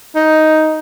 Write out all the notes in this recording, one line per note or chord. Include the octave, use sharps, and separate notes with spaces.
D#4